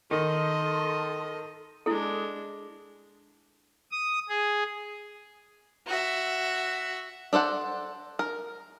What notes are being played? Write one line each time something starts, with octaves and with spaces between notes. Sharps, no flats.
D#3 D#4 A4 D#5 C6
G#3 D4 E4 A4
D#6
G#4
F#4 E5
D4 A4 C5 F#5
A#4